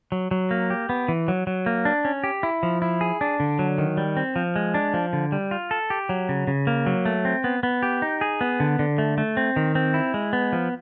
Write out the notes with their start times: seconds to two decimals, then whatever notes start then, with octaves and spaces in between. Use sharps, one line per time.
0.12 F#3
0.31 F#3
0.51 A#3
0.70 G4
0.89 B3
1.08 E3
1.28 F#3
1.47 F#3
1.66 A#3
1.85 D4
2.05 C#4
2.24 G4
2.43 E4
2.63 F3
2.82 E4
3.01 G#4
3.21 D4
3.40 D3
3.59 F#3
3.78 D#3
3.97 G3
4.17 C4
4.36 F3
4.56 G#3
4.74 D4
4.94 F3
5.13 D3
5.32 G3
5.51 F4
5.71 A4
5.90 G4
6.09 F#3
6.29 C#3
6.47 C#3
6.67 A#3
6.86 F#3
7.05 A3
7.25 C4
7.44 B3
7.63 B3
7.83 G4
8.02 D#4
8.21 G#4
8.41 B3
8.60 D3
8.79 D3
8.98 A3
9.18 A3
9.37 C4
9.56 D#3
9.75 C4
9.94 E4
10.14 G#3
10.33 B3
10.53 F3